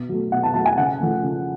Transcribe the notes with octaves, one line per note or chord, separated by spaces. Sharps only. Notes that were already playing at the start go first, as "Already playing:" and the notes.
Already playing: B2
F#3 A3
B2 F#5
A5
F#3 A3 A5
G#5
C#3 F#5
F3 A3
C#3